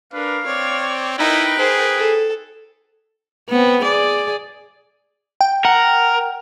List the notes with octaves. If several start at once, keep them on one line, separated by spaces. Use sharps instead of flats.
D4 A#4 B4 F5
C4 C#5 D5
D#4 E4 A#4 B4 G5
G#4 C5
A4
B3 C4
G#4 D5
G5
A#4 F#5